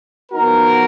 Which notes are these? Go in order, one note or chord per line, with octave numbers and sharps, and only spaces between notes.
F3 B3 D#4 F#4 A#4